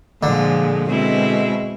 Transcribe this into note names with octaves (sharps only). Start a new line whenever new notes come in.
A#2 D3 F3 G#3
B2 G#3 C4 E4